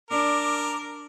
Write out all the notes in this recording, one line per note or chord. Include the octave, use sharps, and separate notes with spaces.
D4 A#4 D6